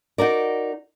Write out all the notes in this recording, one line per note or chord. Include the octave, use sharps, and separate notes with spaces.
D#4 F#4 A#4 D5